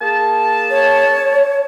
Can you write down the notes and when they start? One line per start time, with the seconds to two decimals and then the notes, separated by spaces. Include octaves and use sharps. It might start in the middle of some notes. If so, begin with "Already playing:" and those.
0.01 A#3 G#4 A5
0.70 C#5